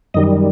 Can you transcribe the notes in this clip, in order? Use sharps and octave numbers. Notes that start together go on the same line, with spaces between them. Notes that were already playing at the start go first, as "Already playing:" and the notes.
F#2 D#3 G3 D#5